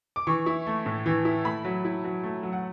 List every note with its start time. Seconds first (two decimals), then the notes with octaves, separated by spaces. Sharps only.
0.16 D6
0.27 E3 C#6
0.46 E4
0.67 A3
0.86 A2
1.06 E3
1.25 E4
1.45 A3 B5
1.64 F#3
1.85 E4
2.04 F#3
2.23 A3
2.43 F#3
2.53 F#5